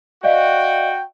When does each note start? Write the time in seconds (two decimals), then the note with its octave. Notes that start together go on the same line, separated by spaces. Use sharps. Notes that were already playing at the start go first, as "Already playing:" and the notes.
0.24 F#4 D5 D#5 F5 G5